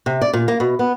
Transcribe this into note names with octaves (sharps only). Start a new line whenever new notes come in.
C3
D5
A#2
A#3
B2
B3